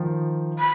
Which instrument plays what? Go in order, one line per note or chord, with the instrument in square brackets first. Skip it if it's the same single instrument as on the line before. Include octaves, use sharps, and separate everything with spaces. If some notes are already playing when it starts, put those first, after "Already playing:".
Already playing: [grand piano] D#3 F3
[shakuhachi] B5